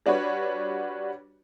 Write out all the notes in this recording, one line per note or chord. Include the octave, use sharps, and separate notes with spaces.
G3 D4 F#4 B4 C#5